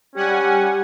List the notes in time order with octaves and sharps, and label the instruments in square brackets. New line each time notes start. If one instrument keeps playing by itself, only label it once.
[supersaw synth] G3 F#5 G#5 [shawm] C#4 [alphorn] G4